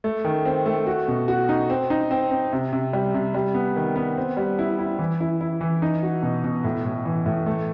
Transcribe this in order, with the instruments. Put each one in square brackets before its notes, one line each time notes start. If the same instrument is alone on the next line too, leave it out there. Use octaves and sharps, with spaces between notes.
[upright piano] A3
D#3
C4
A3
F#4
B2
F#4
D#4
C4
D#4
C4
C4
C3
C3
G3
C3
G3
B3
D#3
B3
C4
G3
E4
E4
E3
E4
E4
E3
D#4
F#4
B2
B2
A2
A2
E3
A2
A3